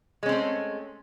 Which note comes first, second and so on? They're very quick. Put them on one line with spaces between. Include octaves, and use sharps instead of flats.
G#3 C#4 C4 A3